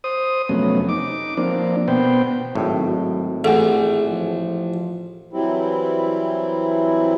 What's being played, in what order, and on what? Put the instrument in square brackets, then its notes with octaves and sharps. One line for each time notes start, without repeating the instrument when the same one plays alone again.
[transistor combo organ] C5 D#6
F2 C3 F#3 A3 B3 C#4
D#4 D6
F3 A#3 C4 D4
B2 B3 C5 G5
[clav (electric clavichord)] G#1 A2 [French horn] F#3
[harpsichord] A1 [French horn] G#4 [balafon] A4 F#5 G#5
[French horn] F3
[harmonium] E3 F#3 G3 C4 E4